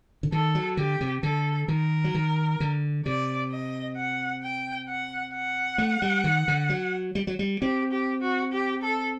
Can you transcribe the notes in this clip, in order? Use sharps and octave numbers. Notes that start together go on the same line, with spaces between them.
D3
D#3 A4
F#3
D3 G4
C3
D3 A4
D#3 A#4
F#3
D#3
D3
C3 D5
D#5
F#5
G5
F#5
F#5
A3
G3
D#3
D3
F#3
G3
F#3
G3
C4 G4
G4
F#4
G4
A4